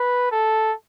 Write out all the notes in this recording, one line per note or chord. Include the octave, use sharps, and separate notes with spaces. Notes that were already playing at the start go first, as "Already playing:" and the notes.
Already playing: B4
A4